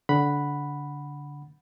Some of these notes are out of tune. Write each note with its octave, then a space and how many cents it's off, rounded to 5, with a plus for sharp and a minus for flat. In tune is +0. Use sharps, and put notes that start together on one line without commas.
D3 -20 F#5 +0 B5 +0